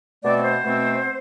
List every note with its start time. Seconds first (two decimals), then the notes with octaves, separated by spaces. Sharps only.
0.23 B2 A3 C4 D5
0.37 D5
0.43 C5
0.64 B2 A3 C4